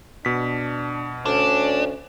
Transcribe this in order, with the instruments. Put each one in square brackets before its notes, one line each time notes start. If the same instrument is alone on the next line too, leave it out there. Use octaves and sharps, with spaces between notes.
[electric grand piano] B2 B6 [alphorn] D4
[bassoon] D2 [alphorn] C#4 [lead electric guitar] D4